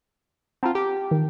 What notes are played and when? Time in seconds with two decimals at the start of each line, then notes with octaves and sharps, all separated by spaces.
0.63 C4 F4 F#5 A5 A#5
0.75 G4
1.11 D#3